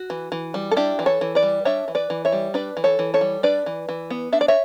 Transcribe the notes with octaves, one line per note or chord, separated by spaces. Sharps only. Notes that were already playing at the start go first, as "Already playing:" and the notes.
Already playing: F#4
E3
E3
G3
A4
D4 E4 G4
E3
A4 C#5
E3
B4 D5
G3
D4 C#5 E5
E3
B4 D5
E3
C#5 E5
G3
D4 B4 D5
E3
A4 C#5
E3
A4 C#5
G3
D4 B4 D5
E3
E3
B3
D4 E5
D5
C#5 E5